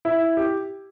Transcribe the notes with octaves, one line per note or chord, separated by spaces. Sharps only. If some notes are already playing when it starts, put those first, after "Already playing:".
E4
G4